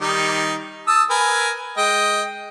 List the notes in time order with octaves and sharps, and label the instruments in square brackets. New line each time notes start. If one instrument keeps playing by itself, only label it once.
[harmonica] D#3 G3 D#4
A5 D#6 E6
A#4 B4 G#5
G#3 D#5 G5